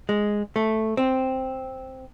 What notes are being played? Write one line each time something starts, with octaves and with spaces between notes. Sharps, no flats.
G#3
A3
C4